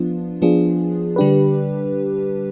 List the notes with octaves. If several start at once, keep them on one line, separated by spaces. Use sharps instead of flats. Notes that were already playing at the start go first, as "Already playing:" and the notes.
Already playing: F3 B3 D4 F4
F3 B3 D4 F4 G#4
D3 G3 D4 G4 B4